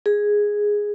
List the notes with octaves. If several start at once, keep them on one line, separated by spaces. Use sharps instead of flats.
G#4